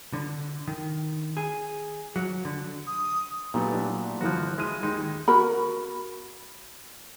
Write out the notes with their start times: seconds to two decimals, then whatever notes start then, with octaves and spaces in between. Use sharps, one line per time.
0.13 D3
0.67 D#3
1.37 G#4
2.16 F#3
2.45 D3
2.87 D#6
3.54 A#2 F#3 A3 B3 G4
3.72 F#3 D4 E4
4.21 G1 E3 F3 F#4 F#6
4.58 G#3 E4 F6 D#7
4.83 D#2 G#3 D#4
5.28 F#4 A#4 B5